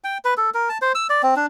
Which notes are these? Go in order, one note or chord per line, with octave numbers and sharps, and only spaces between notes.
G5
B4
A4
A#4
A5
C5
E6
D5
C4
D4